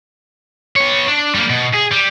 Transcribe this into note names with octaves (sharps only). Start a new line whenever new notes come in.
B3 C#5
D4
G3 A#3
B2
G#4
G3